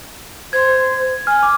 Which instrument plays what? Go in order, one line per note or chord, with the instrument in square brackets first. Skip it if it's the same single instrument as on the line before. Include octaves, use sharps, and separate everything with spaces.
[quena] C5 [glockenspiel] G#6
[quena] G#5 [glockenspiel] F6
[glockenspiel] D6